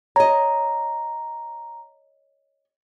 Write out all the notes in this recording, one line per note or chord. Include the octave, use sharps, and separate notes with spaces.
C#5 D#5 A#5